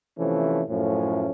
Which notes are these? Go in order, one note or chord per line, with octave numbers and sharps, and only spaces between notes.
C3 E3 F3 A3 C#4
F#2 A2 F3 A3 C#4